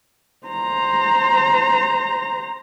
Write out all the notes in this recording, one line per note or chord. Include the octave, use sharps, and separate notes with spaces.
C5 A#5